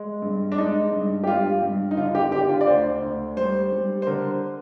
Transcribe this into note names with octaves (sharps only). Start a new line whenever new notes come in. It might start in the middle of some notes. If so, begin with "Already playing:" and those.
Already playing: G#3
G2
D4
G#3 D#4
G2
G4
G2 F4
G2
D#4
D3 F4
G4
D3 G4
F4
D5
D2 C5
D2
G3 C5
G3
C5
D3 A#4